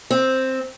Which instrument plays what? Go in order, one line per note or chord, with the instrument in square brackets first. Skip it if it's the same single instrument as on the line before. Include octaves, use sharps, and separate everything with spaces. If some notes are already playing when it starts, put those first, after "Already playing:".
[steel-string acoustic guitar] C4